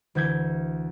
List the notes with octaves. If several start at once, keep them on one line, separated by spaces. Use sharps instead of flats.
D2 E3 G6 G#6